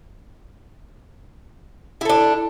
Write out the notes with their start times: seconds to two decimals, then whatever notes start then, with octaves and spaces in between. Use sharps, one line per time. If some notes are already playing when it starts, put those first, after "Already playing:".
2.01 E4
2.05 A4
2.09 D4